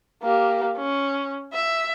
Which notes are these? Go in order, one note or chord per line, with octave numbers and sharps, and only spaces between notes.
A#3 G4
C#4
E5